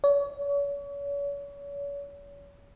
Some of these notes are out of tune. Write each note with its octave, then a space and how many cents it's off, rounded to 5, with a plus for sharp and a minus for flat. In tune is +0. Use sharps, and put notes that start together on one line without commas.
C#5 +40